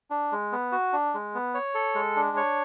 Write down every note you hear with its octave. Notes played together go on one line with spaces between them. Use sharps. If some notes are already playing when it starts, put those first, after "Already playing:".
D4
G#3
B3
F#4
D4
G#3
B3
C#5
A4
G#3
D4
C#5